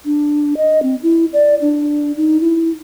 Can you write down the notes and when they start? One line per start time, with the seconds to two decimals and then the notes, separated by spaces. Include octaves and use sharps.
0.05 D4
0.57 D#5
0.83 C4
1.03 E4
1.33 D5
1.61 D4
2.17 D#4
2.41 E4